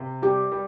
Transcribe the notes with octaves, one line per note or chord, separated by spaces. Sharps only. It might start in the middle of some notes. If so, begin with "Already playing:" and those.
Already playing: C3
G3 G4
G3